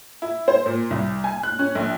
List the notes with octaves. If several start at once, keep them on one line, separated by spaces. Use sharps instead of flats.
E4
C5
A#2
C2
G#5
F#6
C#4
A#1